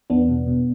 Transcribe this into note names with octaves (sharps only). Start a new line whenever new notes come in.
E2 B3 D4
B2
B2